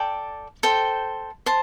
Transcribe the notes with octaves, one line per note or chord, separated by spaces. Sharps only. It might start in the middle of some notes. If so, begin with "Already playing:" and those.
Already playing: A4 D5 G5
A4 C5 G5
C5 A5